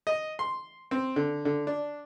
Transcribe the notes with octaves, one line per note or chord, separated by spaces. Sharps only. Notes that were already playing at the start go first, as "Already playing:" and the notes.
D#5
C6
C4
D3
D3
D4